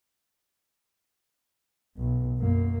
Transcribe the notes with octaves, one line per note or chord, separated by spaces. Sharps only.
B1
F#2 A#3